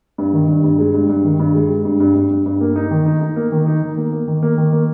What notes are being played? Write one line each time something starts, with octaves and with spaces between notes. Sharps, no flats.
G2
D#3
G2
G2
G#3
G2
G2
D#3
G2
G#3
G#3
G2
G2
G2
G2
G2
A#3
D#4
D#3
D#4
D#4
A#3
D#3
D#4
D#3
A#3
A#3
D#3
A#3
D#3
A#3